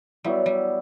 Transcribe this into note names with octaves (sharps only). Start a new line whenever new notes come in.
F#3 G3 B3 E4
G3